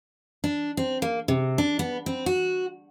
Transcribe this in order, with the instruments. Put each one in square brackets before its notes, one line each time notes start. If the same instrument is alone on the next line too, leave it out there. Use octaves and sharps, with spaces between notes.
[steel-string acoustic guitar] D4
C4
A#3
C3
D4
B3
C4
F#4